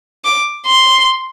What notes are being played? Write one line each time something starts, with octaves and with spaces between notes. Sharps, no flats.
D6
C6